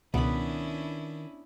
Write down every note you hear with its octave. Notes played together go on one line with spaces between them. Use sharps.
C#2 B2 D#3 B3 C#4 D4 E4 B5